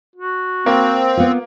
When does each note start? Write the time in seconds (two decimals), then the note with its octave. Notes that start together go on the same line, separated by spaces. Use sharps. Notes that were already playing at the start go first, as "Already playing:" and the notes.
0.16 F#4
0.66 A#3 C4
1.17 B3 F4